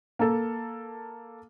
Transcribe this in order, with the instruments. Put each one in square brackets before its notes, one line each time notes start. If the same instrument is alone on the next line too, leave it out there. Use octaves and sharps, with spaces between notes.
[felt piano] A#3 A4